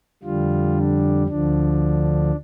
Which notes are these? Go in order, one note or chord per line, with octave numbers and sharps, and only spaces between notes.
F2 D3 G3 F4
D4
D2 D3 F3 D4